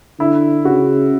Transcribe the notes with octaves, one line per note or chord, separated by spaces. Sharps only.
D3 E4
C#3 F#4